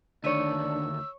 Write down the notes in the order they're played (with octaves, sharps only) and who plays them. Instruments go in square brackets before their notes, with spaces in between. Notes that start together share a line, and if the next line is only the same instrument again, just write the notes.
[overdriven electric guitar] D2 D#3 [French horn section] D4 D5 [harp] C#5 D#7 [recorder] E6